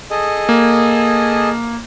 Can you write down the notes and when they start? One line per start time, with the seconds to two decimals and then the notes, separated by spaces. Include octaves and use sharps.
0.11 G#4 A4 D#5
0.49 A#3